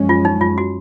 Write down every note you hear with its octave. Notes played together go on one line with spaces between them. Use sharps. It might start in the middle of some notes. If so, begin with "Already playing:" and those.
Already playing: F#2 F3 G#3 C#4
F4
D#4
F4
F#4